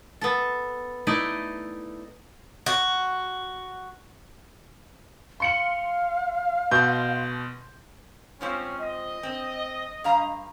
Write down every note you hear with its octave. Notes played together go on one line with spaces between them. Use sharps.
B3 A4
A3 D#4 E4 D5 D#5
F#4
F5 C6 C#7 F#7
B2 C6 G6
G#2 F3 C4 C#4
D#5
C4
G2 F5 A#5